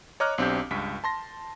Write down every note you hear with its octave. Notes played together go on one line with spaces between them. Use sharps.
C#5 D#5 A#5 D6 F6 F#6
B1 C4 D4 G4 G6
C#2 G2 B6
A5 C6 A#6